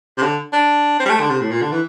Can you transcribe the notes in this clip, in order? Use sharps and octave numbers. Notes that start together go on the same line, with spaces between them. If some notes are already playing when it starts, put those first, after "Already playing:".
C3
D3
D4
C4
G3
A3
D3
C3
A2
A#2
D3
E3